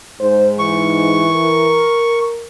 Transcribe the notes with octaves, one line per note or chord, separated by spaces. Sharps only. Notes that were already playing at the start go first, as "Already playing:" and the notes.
G#2 C5
E3 C#6
A#4